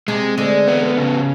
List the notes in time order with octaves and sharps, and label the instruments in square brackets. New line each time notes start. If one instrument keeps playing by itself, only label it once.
[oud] C3 [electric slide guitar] G#3
[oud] D2 D3 [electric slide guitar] G#3
[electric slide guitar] B3
C#3